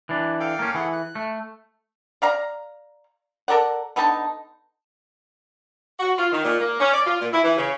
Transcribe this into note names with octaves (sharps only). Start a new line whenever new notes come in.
E3 D4
A4 F5 G5
A#3 C#4
E3 G#4 A4 F#5
F#6
A3
D5 F5 A#5
A4 A#4 D5 F#5
D3 B3 D#4 A5
F#4
F4
D#3
A#2
A#3
C#4
D5
F4
A#2
E4
E3
C#3